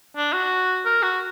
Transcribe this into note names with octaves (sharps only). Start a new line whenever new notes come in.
D4
F#4
A#4
F#4